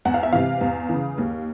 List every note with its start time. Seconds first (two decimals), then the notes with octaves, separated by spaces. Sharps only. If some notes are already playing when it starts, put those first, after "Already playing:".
0.05 E2 F#5
0.14 F5
0.23 E5
0.32 C3 E3 F5
0.61 E2
0.89 C#3 E3
1.18 D#2